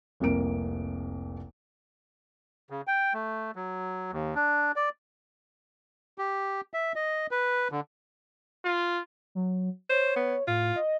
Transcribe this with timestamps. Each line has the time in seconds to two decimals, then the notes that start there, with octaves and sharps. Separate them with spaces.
0.20 F1 C2 A#3 A#4 D7
2.70 C#3
2.87 G5
3.14 A3
3.56 F#3
4.12 D#2
4.35 D4
4.76 D5
6.18 G4
6.74 E5
6.96 D#5
7.31 B4
7.72 D3
8.65 F4
9.35 F#3
9.90 C5 C#5
10.16 B3
10.48 A2 F4
10.76 D#5